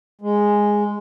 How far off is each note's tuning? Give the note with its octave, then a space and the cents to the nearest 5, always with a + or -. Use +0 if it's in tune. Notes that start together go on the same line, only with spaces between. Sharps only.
G#3 -5